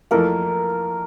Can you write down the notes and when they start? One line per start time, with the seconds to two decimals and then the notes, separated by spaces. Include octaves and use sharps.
0.11 F2 E3 A3 A#3 A#4